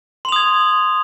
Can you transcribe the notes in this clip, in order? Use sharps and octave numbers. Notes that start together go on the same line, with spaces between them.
C6 D#6 G#6 F7